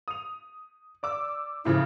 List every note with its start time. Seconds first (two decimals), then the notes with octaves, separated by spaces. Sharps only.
0.08 D#6 F7
1.03 D5 D6 E6
1.65 A2 C#3 F3 E4